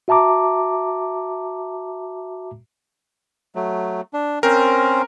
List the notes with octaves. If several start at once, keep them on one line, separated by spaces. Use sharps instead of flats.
F#4 E5 A5 A#5 D6
F#3 A3
D4
C4 C#4 A#4 C5